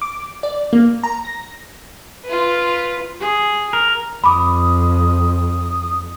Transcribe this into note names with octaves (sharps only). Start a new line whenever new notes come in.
D6
D5
A#3
A#5
A#6
F4 B4
G#4
A#4
F2 B5 D6 D#6